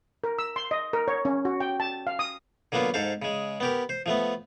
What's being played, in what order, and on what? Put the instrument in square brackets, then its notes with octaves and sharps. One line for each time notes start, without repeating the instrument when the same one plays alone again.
[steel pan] A#4
E6
C6
D#5
A#4
C#5
C#4
F#4
G5
A5
F5
D#6
[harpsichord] D3 F#3 A#3 B3 F4
G#2 A4 C5 F5
C#3 G#3
B3 G4 A#4
C5
F3 A3 B3